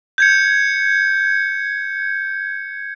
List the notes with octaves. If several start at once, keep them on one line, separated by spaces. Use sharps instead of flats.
G6 G#6 C#7